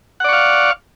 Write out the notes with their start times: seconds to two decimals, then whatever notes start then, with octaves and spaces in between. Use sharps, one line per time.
0.20 F#5
0.24 D5
0.29 C#6
0.33 F5